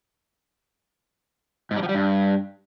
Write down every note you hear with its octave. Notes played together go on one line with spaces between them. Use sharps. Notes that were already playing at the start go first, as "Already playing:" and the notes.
G#2
G3
F3
G3
G2